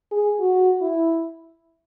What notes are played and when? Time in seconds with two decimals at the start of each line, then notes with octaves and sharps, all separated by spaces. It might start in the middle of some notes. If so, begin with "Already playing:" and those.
0.12 G#4
0.40 F#4
0.82 E4